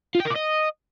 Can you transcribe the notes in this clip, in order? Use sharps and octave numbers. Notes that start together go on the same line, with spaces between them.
F4
G5
A#4
D5
D#5